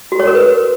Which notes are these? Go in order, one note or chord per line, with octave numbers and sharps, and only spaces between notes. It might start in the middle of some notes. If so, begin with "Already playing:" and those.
F#4
C#5
A#4
B4